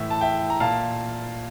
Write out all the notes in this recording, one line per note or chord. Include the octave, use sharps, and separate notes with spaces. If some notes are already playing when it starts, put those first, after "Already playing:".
Already playing: A2 E3 E5
A5
E5 G5
A#5
A#2 F5 A5